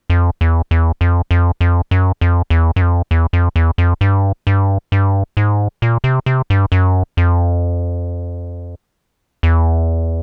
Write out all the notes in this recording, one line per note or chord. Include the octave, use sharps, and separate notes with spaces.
F2
E2
E2
F2
F2
F2
F#2
F2
E2
F#2
F2
E2
F2
E2
F2
G2
G2
G2
G#2
A#2
C3
C3
G2
F#2
F2
E2